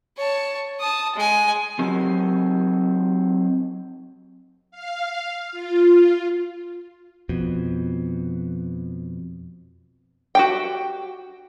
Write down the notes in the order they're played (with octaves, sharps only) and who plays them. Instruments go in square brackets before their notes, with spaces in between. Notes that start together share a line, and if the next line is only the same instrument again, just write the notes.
[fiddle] C#5 A5
A5 D#6
G#3 G#5
[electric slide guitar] F#3 C4 D#4 G4
[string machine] F5
F4
[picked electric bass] F2 B2
[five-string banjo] F#4 G4 G5